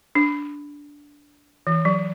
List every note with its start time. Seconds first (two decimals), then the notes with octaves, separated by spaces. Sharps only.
0.15 D4
1.67 E3
1.85 F#3